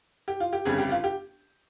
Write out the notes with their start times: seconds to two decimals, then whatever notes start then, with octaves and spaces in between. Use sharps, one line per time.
0.28 G4
0.40 F4
0.53 G4
0.65 G1 F2 C#3 G3 G#4
0.78 G4
0.92 F4
1.04 G4